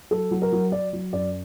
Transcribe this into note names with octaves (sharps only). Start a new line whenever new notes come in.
F#3 A4
F#3
A#4
F#3
F#3 D5
F#3
F#2 D5